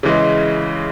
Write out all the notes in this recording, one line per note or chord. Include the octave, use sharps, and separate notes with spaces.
C#3 E3 G#3